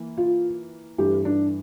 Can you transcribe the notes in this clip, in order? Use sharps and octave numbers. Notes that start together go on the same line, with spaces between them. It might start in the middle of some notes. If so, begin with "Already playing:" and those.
Already playing: E3 A#3
F4
G2 E3 A3 G4
D4